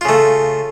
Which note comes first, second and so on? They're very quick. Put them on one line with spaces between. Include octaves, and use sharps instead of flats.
F4 C#3 A3